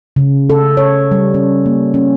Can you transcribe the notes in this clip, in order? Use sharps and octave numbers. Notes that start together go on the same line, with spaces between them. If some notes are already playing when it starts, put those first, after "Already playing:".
C#3
A4
C#5
G3
C#4
A#3
C#4